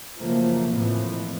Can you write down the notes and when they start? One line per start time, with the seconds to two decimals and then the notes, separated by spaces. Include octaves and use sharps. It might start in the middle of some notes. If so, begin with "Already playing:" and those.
0.19 F#2 C#3 F3 A3 A#3
0.70 F2 A2 E3 F3